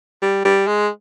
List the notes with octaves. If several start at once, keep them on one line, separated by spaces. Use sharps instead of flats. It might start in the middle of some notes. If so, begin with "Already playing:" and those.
G3
G3
G#3